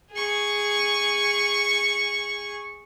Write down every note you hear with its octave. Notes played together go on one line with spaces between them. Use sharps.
G#4 C#6